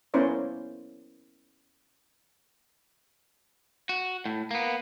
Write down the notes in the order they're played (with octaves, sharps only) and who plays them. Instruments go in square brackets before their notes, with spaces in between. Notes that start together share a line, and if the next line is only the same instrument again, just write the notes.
[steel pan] A#3 B3 C#4 E4 C5 D5
[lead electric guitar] F#4
A2
A#3 B3